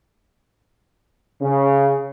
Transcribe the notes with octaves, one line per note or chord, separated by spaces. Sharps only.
C#3